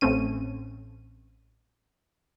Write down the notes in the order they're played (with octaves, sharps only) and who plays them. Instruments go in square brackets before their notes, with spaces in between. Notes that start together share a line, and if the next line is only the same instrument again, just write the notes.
[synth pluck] A1 A3 C4 C#4 D#7